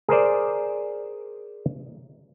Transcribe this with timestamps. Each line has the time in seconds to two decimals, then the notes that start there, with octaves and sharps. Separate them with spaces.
0.09 G#4 A#4 C5 D5